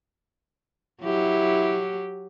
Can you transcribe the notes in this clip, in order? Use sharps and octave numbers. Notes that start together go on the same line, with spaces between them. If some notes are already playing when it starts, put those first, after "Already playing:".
F#3 E4 G4